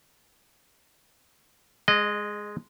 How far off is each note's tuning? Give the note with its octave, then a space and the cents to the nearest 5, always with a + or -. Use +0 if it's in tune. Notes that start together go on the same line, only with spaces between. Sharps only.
G#3 +0 D#5 -25